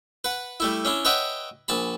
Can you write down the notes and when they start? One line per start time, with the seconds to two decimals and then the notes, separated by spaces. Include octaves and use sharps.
0.24 B4 F#5
0.60 G3 A3 E4
0.85 C#4 D4 E4
1.05 B4 C#5 D#5 E5 F#5 G5
1.68 A#1 G#5 A5 B5